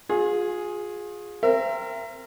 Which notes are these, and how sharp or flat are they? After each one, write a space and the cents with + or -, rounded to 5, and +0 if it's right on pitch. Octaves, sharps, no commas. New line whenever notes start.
F4 +35 G#4 +0
C4 +0 A#4 -10 E5 +35